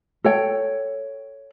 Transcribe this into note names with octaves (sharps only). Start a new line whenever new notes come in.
A4 C#5 G5